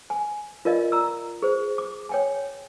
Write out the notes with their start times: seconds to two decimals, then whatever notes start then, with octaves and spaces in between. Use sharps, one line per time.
0.10 G#5
0.65 F4 A#4 D5 D#5 F5
0.92 A#5 E6
1.42 G#4 C5
1.78 D6
2.09 C#5 G5 G#5